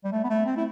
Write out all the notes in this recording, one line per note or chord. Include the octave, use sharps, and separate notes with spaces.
G3
A3
B3
A3
C4
E4